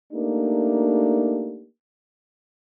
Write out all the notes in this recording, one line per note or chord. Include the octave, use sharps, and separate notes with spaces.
A3 A#3 D4 D#4 G4